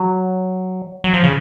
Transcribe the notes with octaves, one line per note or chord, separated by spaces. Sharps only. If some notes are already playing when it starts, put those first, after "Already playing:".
Already playing: F#3
F#3
F3
C#3